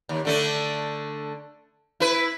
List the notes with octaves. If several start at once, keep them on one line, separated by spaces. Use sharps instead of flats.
D#2
D3 A3 D4
E4 B4